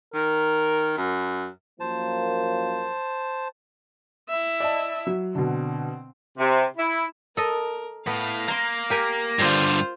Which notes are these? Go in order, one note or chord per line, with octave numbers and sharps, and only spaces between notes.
D#3 A#4
F#2
F#2 F3 A#3 C5 A5
E4 E5
D5 D#5 A5
F#3
B2 D3 C4
C3
E4
A4 A#4 D#5
A2 B3 F5
A#3 A#5 C6
G4 A#4 G#5
G2 D3 F4 C5